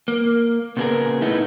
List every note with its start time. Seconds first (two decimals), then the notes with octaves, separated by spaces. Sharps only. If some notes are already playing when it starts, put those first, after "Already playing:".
0.08 A#3
0.77 A#2 C#3 B3 E4 G#4 A#4
1.21 A2 A3 B3 D#4 E4